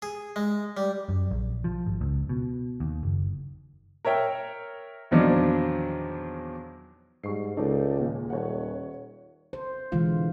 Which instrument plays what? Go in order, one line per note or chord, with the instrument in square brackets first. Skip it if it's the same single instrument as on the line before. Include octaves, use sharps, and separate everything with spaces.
[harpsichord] G#4
G#3
G3
[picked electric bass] F#2
A#1
F3
G#1
C#2
B2
D#2
F#1
[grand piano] A#4 C#5 E5 G5
E2 A#2 D#3 F3 F#3 D4
[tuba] G#2 [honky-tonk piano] G3 C#6 C7
[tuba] C#2 [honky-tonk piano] D#4 A4 D5
[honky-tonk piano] D#2 A#2 G#3
[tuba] D#1 [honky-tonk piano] C#5 F#5
[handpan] C5
B2 D3 E3 G#3 F4 F5